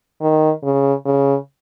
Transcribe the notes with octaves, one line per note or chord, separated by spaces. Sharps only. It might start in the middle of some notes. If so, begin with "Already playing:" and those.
D#3
C#3
C#3